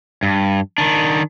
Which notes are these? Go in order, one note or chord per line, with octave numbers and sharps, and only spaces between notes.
G2
D#3 D4